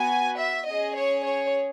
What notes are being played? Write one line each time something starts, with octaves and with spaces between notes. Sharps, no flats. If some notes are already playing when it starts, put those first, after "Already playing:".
Already playing: B3 F#4 G#5
E5
C#4 G#4 D#5
C#5
C#5